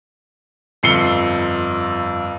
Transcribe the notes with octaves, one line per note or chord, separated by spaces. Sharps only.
G1 F2 C7 C#7 G7